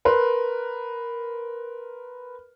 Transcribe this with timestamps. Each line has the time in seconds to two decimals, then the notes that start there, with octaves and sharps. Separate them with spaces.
0.05 A#4 B4 C6